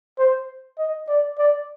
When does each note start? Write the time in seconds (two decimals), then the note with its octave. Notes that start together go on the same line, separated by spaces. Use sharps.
0.19 C5
0.79 D#5
1.08 D5
1.38 D5